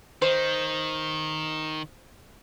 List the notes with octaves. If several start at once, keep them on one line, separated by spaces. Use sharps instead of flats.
D#3 C5